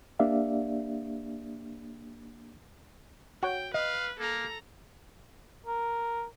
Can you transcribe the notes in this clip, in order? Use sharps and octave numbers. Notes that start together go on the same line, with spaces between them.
A#3 D4 G4 D5 E5 F5
F#4 C#5 G5
B4 D#5 F5
A#3 A4 A#5
A#4